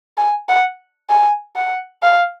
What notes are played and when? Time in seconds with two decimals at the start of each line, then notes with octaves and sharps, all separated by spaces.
0.17 G#5
0.49 F#5
1.10 G#5
1.56 F#5
2.02 F5